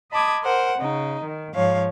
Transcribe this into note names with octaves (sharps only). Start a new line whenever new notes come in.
D#5 A5 B5 D6 D#6 G#6
A#4 C5 F#5
C#3 D#4
D#3
G#2 F3 C#5 F5